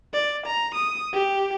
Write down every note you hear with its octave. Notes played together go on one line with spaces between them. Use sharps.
D5
A#5
D#6
G4